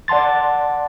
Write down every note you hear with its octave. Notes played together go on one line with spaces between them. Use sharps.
D5 F#5 A5 C6 A6